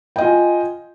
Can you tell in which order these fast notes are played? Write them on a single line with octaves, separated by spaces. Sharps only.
G5 D#5 F4 G#5